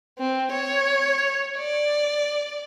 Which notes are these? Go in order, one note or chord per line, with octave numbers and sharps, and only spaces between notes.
C4
C#5
D5